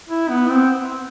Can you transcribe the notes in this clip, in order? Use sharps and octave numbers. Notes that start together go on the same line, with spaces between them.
E4
B3
C4